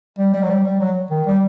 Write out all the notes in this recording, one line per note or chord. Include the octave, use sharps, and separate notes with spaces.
G3
G3
F#3
G3
G3
F#3
D#3
G3